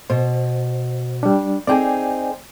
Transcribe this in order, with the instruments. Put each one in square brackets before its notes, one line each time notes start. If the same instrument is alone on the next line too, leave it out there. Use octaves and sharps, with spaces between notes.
[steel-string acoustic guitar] B2 [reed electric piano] C5
[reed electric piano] G3 D4
[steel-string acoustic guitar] C4 D#4 G#4 [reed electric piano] D5 G5 G#5